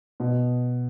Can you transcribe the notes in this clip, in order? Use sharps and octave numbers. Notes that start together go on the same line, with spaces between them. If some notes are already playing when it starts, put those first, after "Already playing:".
B2